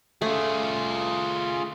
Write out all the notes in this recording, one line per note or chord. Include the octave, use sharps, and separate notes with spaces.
A3 F4 G#4